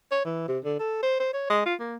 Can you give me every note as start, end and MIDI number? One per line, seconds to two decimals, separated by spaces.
0.11 0.20 73
0.25 0.44 52
0.48 0.58 48
0.64 0.75 50
0.79 0.99 69
1.03 1.19 72
1.20 1.33 72
1.34 1.47 73
1.50 1.63 56
1.66 1.74 65
1.80 1.96 58